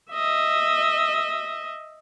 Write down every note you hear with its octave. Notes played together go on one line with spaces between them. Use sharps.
D#5 E5